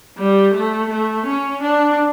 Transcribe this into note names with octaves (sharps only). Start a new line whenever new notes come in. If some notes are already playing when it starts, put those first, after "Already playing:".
G3
A3
A3
C#4
D4